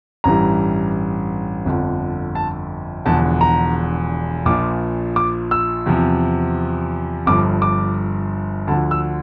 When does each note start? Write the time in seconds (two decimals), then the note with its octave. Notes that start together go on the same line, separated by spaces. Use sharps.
0.24 A1 G2 E3 G3 A#5
1.65 G1 F2 D3 F3
2.35 A5
3.05 E1 E2 D3 F3 A5
3.41 A#5
4.46 A#1 A#2 F3 D6
5.16 D6
5.51 E6
5.86 E2 C3 F3
7.26 G1 G2 F3 D6
7.62 D6
8.67 D2 D3 F3 A5
8.91 E6